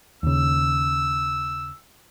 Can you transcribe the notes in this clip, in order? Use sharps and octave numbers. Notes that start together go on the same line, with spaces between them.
D#2 C#3 E6